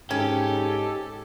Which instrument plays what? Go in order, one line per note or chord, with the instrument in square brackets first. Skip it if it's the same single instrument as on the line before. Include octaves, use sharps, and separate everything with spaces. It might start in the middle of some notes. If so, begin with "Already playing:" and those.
[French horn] G#2 [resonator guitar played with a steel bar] C#4 [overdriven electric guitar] G4 [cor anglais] A4